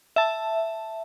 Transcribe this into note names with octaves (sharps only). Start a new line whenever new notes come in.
E5 A5